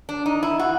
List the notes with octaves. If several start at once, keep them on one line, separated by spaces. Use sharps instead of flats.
D4
D#4
E4
F#4